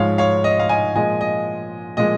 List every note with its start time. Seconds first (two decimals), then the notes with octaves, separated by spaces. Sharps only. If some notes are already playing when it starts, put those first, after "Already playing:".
Already playing: G#2 F3 G#3 C#5 F5
0.18 C#5 F5
0.44 D#5
0.59 F5
0.69 D#5 G#5
0.95 A#2 F3 G#3 D#5 G#5
1.21 D#5
1.97 A#2 F3 G#3 D#5